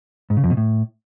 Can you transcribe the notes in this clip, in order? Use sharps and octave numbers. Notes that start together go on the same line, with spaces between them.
G#2
C#3
F2
B2
A2